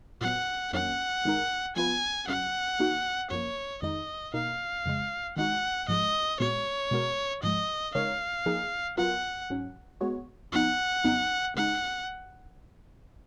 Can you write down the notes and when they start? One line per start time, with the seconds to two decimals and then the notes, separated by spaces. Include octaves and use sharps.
0.21 A#2 F#3 B3 F#5
0.73 F2 D#3 F#3 A#3 C#4 F#5
1.25 G#2 D#3 G#3 D#4 A#4
1.76 F3 B3 F4 B4 G#5
2.28 F#2 C#3 F#3 F#5
2.79 D#3 A#3 D#4 F#4
3.30 F#2 F3 A#3 C#5
3.82 F2 D#3 G#3 D#4 D#5
4.34 B2 A#3 D#4 F5
4.86 F2 C#3 G#3
5.37 D#3 G#3 D#4 F#4 F#5
5.88 G#2 F3 G#3 D#5
6.40 A#2 G#3 B3 F#4 C#5
6.91 B2 G#3 B3 F#4 A#4
7.43 G#2 F3 G#3 D#5
7.94 C#3 G#3 D#4 A#4 C#5 F5
8.46 F3 A#3 D#4 G#4
8.98 F#3 B3 F4 A#4 F#5
9.50 G#2 F#3 C#4
10.01 G#3 B3 F#4 C#5
10.52 F2 F3 B3 D#4 F#5
11.04 F2 C#3 F#3 B3 D#4
11.56 C#3 G#3 D#4 F#5